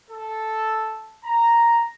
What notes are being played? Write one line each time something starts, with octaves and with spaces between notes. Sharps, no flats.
A4
A#5